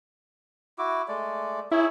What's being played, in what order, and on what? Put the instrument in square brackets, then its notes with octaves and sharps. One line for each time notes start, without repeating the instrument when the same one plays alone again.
[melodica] E4 F#4 D6
G#3 A3 D5
[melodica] D#4 G#4 C#5 [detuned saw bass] E4